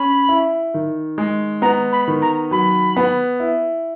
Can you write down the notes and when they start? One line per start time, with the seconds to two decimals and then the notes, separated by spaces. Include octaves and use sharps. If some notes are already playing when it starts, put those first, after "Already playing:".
Already playing: C#4 B5
0.29 E4
0.74 D#3
1.18 G#3
1.62 B3 A#5
1.92 B5
2.08 D#3
2.22 A#5
2.51 F#3 B5
2.97 B3
3.40 E4